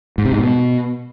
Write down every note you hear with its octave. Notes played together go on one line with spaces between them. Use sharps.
G#2
C3
G#2
B2